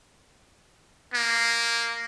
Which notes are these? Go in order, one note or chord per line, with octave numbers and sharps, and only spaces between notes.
A#3